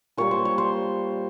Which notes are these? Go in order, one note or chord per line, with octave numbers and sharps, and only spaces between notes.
A#2 G3 A#3 C#5
C5
C#5
C5